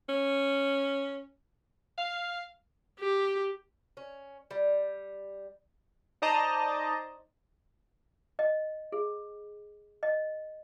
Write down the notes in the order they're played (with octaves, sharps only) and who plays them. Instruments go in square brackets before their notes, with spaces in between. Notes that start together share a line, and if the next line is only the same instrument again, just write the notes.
[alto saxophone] C#4
[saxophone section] F5
[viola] G4
[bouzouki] C#4
G3
[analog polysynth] D#4 C5 D5 D#5 A5 A#5
[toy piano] D#5
G#4
D#5